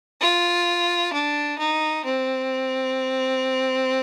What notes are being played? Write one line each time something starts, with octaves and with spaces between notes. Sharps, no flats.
F4
D4
D#4
C4